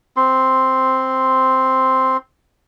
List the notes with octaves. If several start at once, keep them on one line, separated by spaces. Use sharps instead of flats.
C4 C6